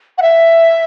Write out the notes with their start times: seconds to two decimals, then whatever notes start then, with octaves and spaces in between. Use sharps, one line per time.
0.18 F#5
0.22 E5